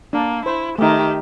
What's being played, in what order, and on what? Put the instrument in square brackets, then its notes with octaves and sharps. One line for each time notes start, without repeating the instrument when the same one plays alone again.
[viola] A#3 [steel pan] D4
[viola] E4 [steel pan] C5
[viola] D#3 G4 [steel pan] A3 D#4